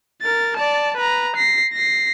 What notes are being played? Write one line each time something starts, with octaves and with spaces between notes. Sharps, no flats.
A#4 A6
D5 A5
B4 A#5
A#6 C7
A#6 C7